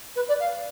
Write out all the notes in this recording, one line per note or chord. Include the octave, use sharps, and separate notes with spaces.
B4
D5
F5